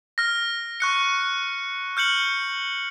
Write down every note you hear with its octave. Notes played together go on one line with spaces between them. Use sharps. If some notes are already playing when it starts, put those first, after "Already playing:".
F6 A#6
C#6 F#6 C#7
F6 G6 C#7 F#7